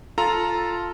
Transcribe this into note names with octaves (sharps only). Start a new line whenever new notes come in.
F4 A4 A#5